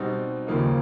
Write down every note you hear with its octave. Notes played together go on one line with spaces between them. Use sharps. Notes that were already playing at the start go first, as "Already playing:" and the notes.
Already playing: B2 G3 C4 D#4
D#2 C#3 F3 A#3 D#4